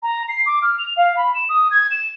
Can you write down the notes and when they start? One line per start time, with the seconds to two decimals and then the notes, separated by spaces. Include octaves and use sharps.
0.03 A#5
0.28 C7
0.46 D6
0.62 F6
0.78 F7
0.97 F5
1.17 B5
1.34 E7
1.49 D#6
1.71 G#6
1.91 E7